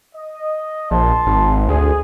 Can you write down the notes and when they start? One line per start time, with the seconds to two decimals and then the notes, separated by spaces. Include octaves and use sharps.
0.16 D#5
0.91 A#1 A5 C6
1.26 G#1
1.68 D2 G#4